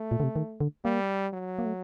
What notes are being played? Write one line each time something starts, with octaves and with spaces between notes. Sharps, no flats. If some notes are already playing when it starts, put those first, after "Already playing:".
Already playing: A3
A#2
D3
C3
D#3
D3
G3 A#3
F#3
A#3
A3